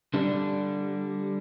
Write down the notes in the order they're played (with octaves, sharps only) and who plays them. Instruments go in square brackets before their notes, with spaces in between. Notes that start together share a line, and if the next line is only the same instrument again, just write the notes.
[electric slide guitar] D3 G3 D4